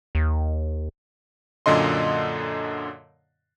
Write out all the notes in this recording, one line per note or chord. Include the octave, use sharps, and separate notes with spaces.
D#2
F#2 A#2 D3 D#5 C6